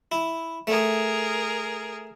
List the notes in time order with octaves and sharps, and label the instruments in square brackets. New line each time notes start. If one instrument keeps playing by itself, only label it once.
[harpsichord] E4
[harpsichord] A3 [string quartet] G#4 A#4